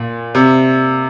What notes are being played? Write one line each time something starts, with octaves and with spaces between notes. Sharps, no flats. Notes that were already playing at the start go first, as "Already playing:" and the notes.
Already playing: A#2
C3